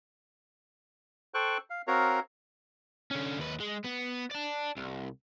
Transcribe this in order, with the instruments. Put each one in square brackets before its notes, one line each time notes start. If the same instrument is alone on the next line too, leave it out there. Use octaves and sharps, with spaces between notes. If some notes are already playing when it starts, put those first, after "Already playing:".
[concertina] A4 C5 G5 C#6 F#6
F5
C4 F#4 A#4 C#5 F5 A#5
[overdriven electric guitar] D3 C#4
D#2 B4
G#3
B3
D5 A5
C2